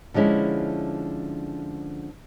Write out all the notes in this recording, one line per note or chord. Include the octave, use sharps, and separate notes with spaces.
D3 F3 G#3 C#4 E4